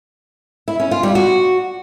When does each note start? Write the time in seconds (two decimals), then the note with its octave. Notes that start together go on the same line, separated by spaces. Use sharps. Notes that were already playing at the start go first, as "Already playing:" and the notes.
0.68 E4
0.80 C#4
0.91 F4
1.03 G3
1.15 F#4